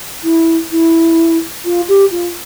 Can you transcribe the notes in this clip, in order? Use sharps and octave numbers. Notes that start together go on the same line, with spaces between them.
E4
E4
F4
G4
F4